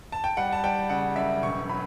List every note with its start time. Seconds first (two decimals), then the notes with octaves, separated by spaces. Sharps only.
0.12 A5
0.24 G5
0.37 G3 F#5
0.52 A5
0.64 G3 G5
0.89 C#3 F#5
1.16 F#2 E5
1.43 E1 C#6
1.69 F#3 B5